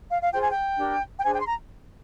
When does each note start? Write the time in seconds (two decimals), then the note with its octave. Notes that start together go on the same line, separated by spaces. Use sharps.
0.10 F5
0.22 F5
0.33 F4 G#4 C5 G5
0.41 G#5
0.50 G5
0.78 D4 G4 A#4
1.17 G5
1.24 D4 G#4 C5 G#5
1.35 G5
1.42 C6
1.47 A#5